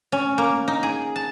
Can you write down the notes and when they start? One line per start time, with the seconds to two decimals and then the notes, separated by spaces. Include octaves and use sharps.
0.12 C#4
0.38 A#3
0.68 D#4
0.83 G#4
1.16 A5